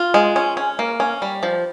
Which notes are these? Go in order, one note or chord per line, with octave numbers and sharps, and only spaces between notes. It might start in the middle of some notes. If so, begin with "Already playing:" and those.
Already playing: F4
G#3
C#4
C#4
A#3
C#4
G3
F3